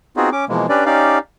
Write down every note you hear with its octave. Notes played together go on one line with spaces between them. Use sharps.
B3 C4 D#4 F4 F#4 G#4
C#4 D6
B2 E3 F3 G#3 A#3
C#4 D4 G4 B4 D5
C#4 D#4 G4 D5 F5